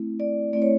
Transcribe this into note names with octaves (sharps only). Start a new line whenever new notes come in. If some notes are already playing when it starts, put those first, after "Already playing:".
Already playing: A3 C4 E4
D5
A3 C4 E4 D5
C#5